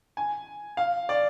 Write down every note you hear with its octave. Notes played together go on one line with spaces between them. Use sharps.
G#5
F5
D5